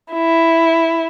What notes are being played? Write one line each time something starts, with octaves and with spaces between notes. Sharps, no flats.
E4